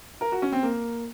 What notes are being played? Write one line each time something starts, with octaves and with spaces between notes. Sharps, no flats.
A#4
F#4
C#4
C4
A#3